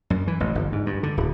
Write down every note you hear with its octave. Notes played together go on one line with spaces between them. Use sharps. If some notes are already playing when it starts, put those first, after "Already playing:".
F#2
E3
A1
G1
G#2
G2
D3
D1